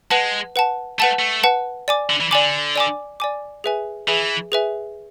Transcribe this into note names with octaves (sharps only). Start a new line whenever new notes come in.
G#3 B4 F#5 A5
B4 F#5 A5
A3 B4 F#5 A5
A3
B4 F#5 A5
D5 G#5 D6
D3
E3
D3 D5 G#5 D6
D5 G#5 D6
D5 G#5 D6
G#4 B4 E5 G#5
E3 G#4 B4 E5 G#5
G#4 B4 E5 G#5